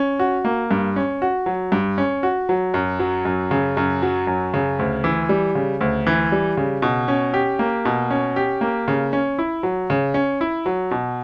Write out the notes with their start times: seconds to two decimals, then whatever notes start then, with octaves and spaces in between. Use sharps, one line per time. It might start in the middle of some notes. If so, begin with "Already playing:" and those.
Already playing: C#4
0.19 F#4
0.45 A#3
0.71 G2
0.96 C#4
1.22 F#4
1.46 F#3
1.72 G2
1.98 C#4
2.23 F#4
2.49 F#3
2.74 F#2
2.99 F#3
3.25 F#2
3.51 C#3
3.77 F#2
4.02 F#3
4.27 F#2
4.54 C#3
4.79 D2
5.04 E3
5.29 G3
5.55 C#3
5.81 D2
6.07 E3
6.32 G3
6.57 C#3
6.82 B2
7.08 C#4
7.34 G4
7.59 A#3
7.85 B2
8.11 C#4
8.36 G4
8.61 A#3
8.88 C#3
9.13 C#4
9.39 E4
9.63 F#3
9.90 C#3
10.14 C#4
10.41 E4
10.66 F#3
10.91 B2